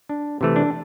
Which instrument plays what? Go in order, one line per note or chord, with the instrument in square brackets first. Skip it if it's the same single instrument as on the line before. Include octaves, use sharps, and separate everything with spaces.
[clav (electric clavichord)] D4
C3 E3 A3
D4